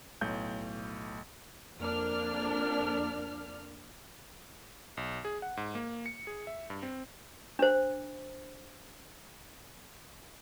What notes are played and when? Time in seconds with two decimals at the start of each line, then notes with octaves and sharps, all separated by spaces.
0.21 B1 A2 G6
1.79 F2 A#3 D4 F6
4.97 B1
5.25 G#4
5.42 F#5
5.57 G#2
5.75 A#3
6.06 C#7
6.27 G#4
6.47 E5
6.70 G2
6.83 C4
7.59 D4 C5